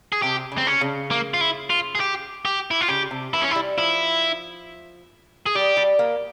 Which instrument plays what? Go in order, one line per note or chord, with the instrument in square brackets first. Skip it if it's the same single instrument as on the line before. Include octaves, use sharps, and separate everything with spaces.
[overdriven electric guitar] G#4
[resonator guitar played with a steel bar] C3 [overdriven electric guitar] G4
[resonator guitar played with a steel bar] C#3
[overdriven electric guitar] C4
C#4
[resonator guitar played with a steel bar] C#3
[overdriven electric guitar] A#3
F4
E4
F4
G#4
G4
G4
E4
F4
[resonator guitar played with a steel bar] C#3 [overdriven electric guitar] G4
[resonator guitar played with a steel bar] C3
[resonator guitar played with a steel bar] E3 [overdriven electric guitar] E4
[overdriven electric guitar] C#4
E4
[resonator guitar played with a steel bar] G3
[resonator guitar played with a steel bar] F3 [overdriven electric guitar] E4
[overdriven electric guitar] G#4
[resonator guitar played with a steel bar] G3 [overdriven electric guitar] G4
[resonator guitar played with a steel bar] G3
A#3